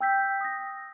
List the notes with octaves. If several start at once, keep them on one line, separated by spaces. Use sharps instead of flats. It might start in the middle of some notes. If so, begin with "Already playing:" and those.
G5 E6 G6 B6
D#6 A#6